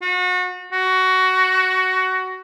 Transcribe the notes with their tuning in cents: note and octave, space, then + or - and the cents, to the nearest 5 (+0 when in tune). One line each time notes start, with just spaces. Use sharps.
F#4 -30
F#4 +15